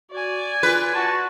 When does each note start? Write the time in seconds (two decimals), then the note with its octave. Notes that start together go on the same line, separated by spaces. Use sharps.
0.11 F#4 D5 G#5
0.63 F4 B4
0.95 F#4 A5